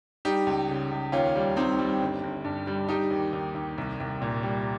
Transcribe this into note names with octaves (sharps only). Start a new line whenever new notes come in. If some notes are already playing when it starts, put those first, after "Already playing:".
G3 D#4 G4
C#2
C#3
C#2
D#2 C#4 F4
G3
G3 C4 D#4
G3
G1
G1
G2
G3
G3 D#4 G4
D#2
D#2
D#2
C2
C2
A#2
G3